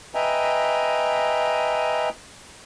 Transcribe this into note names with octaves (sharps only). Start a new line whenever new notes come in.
B4 D#5 E5 G5 G#5 A#5